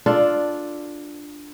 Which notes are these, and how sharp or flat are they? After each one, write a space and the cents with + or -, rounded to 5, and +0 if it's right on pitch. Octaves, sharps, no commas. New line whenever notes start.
D4 +0 F4 +0 A4 +0